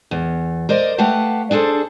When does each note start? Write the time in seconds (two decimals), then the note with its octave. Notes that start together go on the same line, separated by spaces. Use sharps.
0.11 E2
0.69 A#4 C5 D5 D#5
0.98 A3 G4 B4 F5 F#5 A5
1.51 D4 G#4 A4 C5